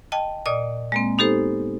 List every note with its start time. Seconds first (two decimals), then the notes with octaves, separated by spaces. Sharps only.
0.12 D#5 G5 A5
0.46 A#2 D5 D#5 D#6
0.92 G#3 A#3 C4
1.18 B3 D#4 G4 A4 C5